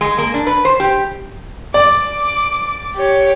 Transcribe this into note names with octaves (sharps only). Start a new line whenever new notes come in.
G#3
A#3
D4
B4
C5
G4
D5 D6
G4 C#5